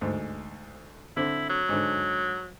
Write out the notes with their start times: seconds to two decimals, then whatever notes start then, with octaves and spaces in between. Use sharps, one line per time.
0.01 D2 G#2
1.17 D3 C4 E4
1.49 F#3
1.69 G#2 D3